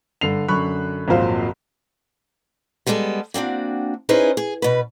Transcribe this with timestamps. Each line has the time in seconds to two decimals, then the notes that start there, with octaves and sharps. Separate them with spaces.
0.21 G2 D3 C7 F7
0.48 F#2 D3 B5 C#6 F#6
1.08 G#1 F2 A#2 F#3 C5 F5
2.87 G3 G#3 B3 G#4 A4
3.34 A#3 C4 D4 F#4
4.09 C#4 D#4 E4 G#4 B4 C5
4.37 G#4
4.62 B2 B4